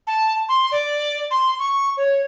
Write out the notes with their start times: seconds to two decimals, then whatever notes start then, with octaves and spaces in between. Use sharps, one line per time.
0.07 A5
0.49 C6
0.72 D5
1.31 C6
1.59 C#6
1.97 C#5